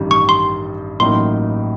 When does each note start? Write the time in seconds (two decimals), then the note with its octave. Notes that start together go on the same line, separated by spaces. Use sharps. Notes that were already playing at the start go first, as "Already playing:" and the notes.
Already playing: A1 G2 D#3 G3
0.11 C#6
0.29 C6
1.00 A1 A2 F#3 A#3 D#4 C6